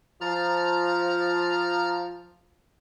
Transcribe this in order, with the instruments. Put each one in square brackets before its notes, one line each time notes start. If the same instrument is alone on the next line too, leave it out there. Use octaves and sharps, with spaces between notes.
[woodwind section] F3 [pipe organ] A#5 F6 A6